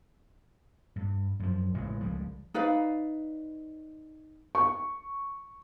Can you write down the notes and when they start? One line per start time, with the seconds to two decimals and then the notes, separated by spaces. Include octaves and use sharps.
0.96 G2
1.39 F#2 F3
1.74 A1 A#2 C#3 G#3
2.01 C#2 F3 G3 G#3
2.54 D#4 B4 D5 F5
4.55 C#6